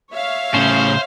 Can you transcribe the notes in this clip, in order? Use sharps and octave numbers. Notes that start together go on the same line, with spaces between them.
C#5 E5 F5
A2 C#3 C#4 C5